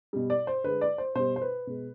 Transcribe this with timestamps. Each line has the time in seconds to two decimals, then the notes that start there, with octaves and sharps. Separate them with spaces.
0.13 B2 G3
0.30 D5
0.47 C5
0.64 D3 G#3 B4
0.81 D5
0.98 C5
1.15 B2 G3 C5
1.36 C5
1.42 B4
1.67 B2 G#3